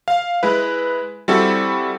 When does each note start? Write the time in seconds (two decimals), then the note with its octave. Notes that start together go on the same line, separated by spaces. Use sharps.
0.08 F5
0.43 G#3 E4 B4
1.28 G3 C4 E4 F#4 A4